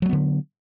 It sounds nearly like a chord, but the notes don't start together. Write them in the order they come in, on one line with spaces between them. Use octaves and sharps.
F#3 G#3 B3 D3